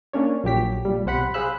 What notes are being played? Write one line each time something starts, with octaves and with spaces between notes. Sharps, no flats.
A#3 C#4 D4 C#5
A#1 F#3 G4 B6
A#2 G3
B1 C3 C5 F#5 B5
G#4 C5 F5 B5 E6 F#6